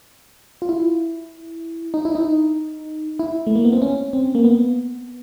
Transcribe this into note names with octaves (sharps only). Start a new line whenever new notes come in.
F4
E4
D#4
E4
D#4
E4
A3
A#3
B3
C4
C#4
C4
A#3
B3